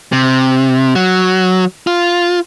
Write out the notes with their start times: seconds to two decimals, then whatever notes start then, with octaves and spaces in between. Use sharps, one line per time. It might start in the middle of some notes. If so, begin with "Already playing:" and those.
0.12 C3
0.95 F#3
1.87 F4